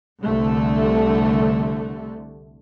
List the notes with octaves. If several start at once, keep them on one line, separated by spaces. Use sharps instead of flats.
C2 D3 A3